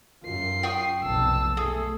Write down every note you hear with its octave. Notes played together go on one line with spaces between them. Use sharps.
F#2 F4 C7
G5 C#6 D#6
F1 B1 B3 A5 E6
A3 G#4 A4